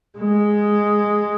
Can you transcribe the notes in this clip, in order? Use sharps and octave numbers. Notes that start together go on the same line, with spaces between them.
G#3